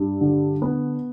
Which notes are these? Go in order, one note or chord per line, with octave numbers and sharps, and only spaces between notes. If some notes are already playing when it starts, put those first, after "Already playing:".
Already playing: G2
D3
B3